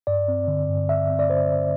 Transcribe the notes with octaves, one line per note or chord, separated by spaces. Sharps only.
G2 D5
C4
D3
G2
G2 E5
C4
D5
D3 C5
G2